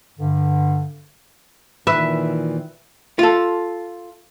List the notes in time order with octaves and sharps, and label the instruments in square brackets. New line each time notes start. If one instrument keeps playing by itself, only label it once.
[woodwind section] G2 D3
[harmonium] A#2 D#3 E3 [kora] B4 [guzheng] E5
[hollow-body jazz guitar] F4 A4